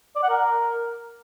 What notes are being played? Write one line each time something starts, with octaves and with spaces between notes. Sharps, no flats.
D5
F#5
A#4